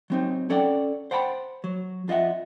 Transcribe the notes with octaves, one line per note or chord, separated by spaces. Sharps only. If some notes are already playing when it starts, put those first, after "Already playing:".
F#3 C4 D#4
C#4 A4 D5 F#5 G5
C5 F#5 G5 A5 B5
F#3
F2 F4 D#5 E5 F#5